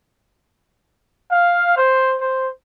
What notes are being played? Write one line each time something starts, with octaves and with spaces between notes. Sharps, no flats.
F5
C5
C5